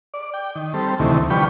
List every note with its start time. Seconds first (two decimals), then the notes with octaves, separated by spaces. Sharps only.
0.14 D5
0.34 G5
0.56 D#3
0.74 G3 C4 A4
0.99 D2 C3 D#3 E3 A3
1.30 D3 F3 G3 B4 G5 C#6